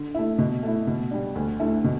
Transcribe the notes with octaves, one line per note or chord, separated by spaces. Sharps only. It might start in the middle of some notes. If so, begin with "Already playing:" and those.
Already playing: D3
A3 E4
B2
A3 E4
B2
G3 D4
D2
D3 A3 E4
B2